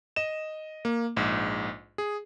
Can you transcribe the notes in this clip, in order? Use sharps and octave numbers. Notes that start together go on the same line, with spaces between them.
D#5 E7
A#3
A#1 G#2
G#4